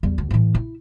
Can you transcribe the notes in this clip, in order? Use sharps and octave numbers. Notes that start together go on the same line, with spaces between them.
E2 G3
D2
A2 E3
E4